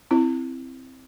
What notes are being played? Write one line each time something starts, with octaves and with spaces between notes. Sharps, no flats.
C4 E4